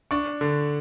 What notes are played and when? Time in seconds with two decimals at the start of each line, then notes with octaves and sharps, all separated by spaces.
0.11 D4 C#6
0.41 D3